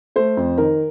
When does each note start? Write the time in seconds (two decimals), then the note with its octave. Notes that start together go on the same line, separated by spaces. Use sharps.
0.16 A3 C5
0.37 F2
0.58 D#3 A#4